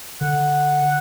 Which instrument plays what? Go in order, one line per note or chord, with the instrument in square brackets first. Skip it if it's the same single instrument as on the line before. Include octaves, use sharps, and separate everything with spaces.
[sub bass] D3 [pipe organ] F#5